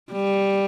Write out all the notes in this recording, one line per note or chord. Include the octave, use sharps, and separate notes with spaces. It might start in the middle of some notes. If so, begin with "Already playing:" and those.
G3